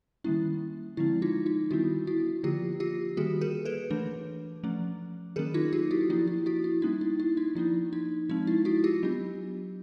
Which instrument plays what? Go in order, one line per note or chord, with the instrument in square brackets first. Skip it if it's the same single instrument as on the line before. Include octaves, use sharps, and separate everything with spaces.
[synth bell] D#3 G3 A#3 C#4 E4
D3 F3 G#3 C4 E4
D#4 F4
D#4 F4
D#3 G3 B3 D4 E4 F#4
E4 F#4
D3 F3 A#3 F4 G4
F4 G4
D#3 G3 A#3 F#4 G#4
G#4 A#4
A4 B4
E3 A3 D4
F3 A3 C#4
D#3 F#3 A#3 C#4 G#4 A#4
D#4 F4
F4 G4
E4 F#4
F3 A#3 D4 E4
E4
E4 F#4
E4
G3 A#3 C#4 D#4
E4
E4
D#4
F3 A#3 D4 E4
D#4
F3 G#3 C4 D#4
E4
E4 F#4
F4 G4
F#3 B3 D4